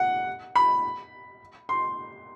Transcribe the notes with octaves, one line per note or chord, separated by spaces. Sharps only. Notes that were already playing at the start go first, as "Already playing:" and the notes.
Already playing: F#5
B5
C6